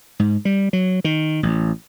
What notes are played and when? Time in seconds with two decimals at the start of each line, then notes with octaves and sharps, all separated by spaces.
0.19 G#2
0.45 G3
0.73 F#3
1.04 D#3
1.43 A1